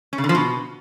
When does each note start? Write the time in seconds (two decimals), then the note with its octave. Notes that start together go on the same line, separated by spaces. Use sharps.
0.13 C#4
0.18 C#3
0.24 D3
0.29 F3
0.35 B2